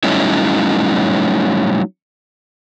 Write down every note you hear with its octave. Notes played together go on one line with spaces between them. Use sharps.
F#3 G3 A3 C#4 D#4 E4